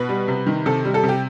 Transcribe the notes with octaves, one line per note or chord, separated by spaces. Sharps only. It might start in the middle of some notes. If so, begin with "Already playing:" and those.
Already playing: B2 B4
G3
C3
D#3
C3 A4
G3
A4
C3
G4